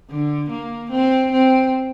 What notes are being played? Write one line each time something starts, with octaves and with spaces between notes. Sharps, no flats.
D3
A#3
C4
C4